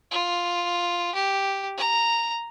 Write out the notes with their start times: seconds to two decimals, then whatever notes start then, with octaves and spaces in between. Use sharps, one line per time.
0.11 F4
1.15 G4
1.77 A#5